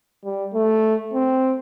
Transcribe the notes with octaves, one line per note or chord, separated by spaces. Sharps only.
G3
A3
C4